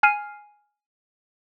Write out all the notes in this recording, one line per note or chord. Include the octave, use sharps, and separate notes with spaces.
G#5 F6 C7 D#7